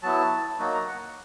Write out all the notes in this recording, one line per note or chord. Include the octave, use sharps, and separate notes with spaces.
F#3 B3 E4 A5
F#3 A#3 D#4 F#4
A#5
F#5